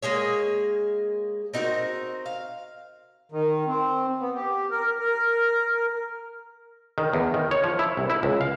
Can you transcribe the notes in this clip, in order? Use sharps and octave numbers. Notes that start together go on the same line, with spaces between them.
G#3 A#3 G#4 C#5
C4 D#4 F#4 A#4
F5
D#3
C4
B3
G4
A#4
A#4
D#3
E2
D#3
C#5
F3
E4
C2
E4
C#2
F5